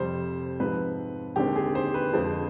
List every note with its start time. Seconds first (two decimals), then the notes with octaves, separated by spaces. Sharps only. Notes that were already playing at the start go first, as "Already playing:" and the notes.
Already playing: F2 C3 G3 C5
0.60 G#2 F3 C4 B4
1.36 D#2 D3 G#3 C4 G4
1.56 G#4
1.75 C5
1.94 B4
2.13 F2 D3 F3 G#3 C5